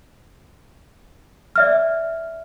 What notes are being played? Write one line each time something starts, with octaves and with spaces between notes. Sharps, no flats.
D5 E5 F6